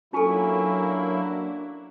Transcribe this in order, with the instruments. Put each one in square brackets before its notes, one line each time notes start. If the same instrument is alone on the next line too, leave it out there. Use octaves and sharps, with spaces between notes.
[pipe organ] F#3 A#3 E4 [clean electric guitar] C#4 G#5 [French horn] D4 [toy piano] F4 A4